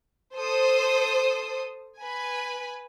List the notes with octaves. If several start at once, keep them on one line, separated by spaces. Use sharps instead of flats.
A4 C5 D#6
B4 G#5